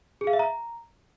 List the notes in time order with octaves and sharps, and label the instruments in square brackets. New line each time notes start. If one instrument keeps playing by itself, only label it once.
[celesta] G#4
F5
E5
A#5